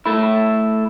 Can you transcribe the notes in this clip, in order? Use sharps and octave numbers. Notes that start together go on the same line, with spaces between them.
A3 E4